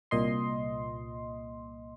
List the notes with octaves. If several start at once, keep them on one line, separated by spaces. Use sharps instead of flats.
C2 A#2 D#5 C6